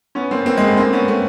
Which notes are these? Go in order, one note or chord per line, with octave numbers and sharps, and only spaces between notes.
B3 C#4
A#3 C4
B3
A#3 C4
G#3 A#3
A3 B3
A#3 C4
B3 C#4
A3 B3